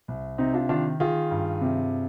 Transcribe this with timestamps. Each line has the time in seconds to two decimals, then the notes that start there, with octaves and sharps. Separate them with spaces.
0.08 C2
0.38 C3 C4 D#4
0.54 D4 F4
0.69 D#3 D4 F4
1.00 D#3 F4 G#4
1.31 G2
1.62 C3